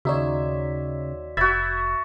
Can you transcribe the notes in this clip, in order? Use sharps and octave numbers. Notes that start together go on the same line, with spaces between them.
D#2 C#3 D#4 F#4 C#5 D5 E5
F1 F#4 E5 B5 E6 G#6 A6